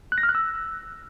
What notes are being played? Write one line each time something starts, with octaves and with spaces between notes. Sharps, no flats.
F#6
A#6
F6
F#6
E6